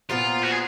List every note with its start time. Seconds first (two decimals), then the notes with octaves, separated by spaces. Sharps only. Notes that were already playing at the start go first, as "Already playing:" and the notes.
0.10 A#2 F3 B3 F4
0.43 F#4
0.51 G#4